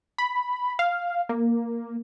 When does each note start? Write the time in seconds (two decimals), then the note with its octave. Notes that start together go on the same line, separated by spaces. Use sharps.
0.18 B5
0.79 F5
1.29 A#3